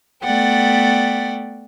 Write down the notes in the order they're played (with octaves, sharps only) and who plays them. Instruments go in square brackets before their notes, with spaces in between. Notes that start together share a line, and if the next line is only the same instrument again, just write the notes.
[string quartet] A3 B3 D5 F#5 G5